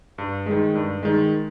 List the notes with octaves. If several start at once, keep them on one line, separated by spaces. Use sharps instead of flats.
G2
D#3 G#3
G2
D#3 G#3